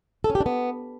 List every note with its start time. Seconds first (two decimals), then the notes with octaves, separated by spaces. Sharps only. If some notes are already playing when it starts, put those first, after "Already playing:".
0.24 A4
0.30 C#4
0.35 G4
0.40 D4
0.46 B3